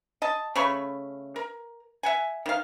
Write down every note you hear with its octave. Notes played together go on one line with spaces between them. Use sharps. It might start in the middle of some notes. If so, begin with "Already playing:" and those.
D#5 A5
C#3 A3 B5 C#6
A#4
E5 F#5 G#5
D#3 F5